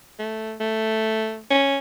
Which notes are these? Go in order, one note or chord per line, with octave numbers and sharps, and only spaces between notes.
A3
A3
C#4